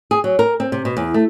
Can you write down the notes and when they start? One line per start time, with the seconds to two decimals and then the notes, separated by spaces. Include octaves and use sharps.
0.11 G#4
0.24 F#3
0.39 A#4
0.60 C4
0.72 C3
0.85 B2
0.97 E2
1.14 A3